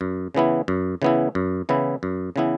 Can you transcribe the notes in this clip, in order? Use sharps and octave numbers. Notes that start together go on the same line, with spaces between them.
F#2
C#3 E3 B3 E4
F#2
C#3 E3 B3 E4
F#2
C#3 E3 B3 E4
F#2
C#3 E3 B3 E4